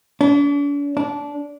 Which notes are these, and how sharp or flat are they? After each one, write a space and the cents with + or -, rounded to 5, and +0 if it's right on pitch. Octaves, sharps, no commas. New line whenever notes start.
D4 -45
D4 -20